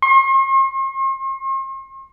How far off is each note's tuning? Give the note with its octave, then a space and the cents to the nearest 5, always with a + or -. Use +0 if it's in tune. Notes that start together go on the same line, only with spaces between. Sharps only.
C6 +45